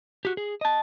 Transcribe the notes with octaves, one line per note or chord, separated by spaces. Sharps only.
F#4 G4
G#4
D#5 A5